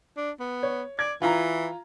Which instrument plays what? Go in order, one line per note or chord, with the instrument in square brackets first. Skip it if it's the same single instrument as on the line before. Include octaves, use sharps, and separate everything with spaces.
[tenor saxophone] D4
B3
[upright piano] C#5
[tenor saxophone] D5 [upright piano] G#6
[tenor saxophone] E3 [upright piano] F4 A#5